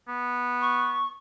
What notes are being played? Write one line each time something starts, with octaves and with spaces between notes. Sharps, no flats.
B3
C#6